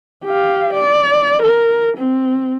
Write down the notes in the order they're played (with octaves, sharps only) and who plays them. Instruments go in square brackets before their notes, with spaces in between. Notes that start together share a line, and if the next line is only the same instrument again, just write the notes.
[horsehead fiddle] G4 F5
D5
A#4
C4